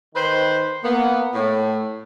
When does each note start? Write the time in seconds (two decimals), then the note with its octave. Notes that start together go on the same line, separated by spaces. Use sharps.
0.15 D#3 B4 C5
0.84 A#3 B3
1.34 A2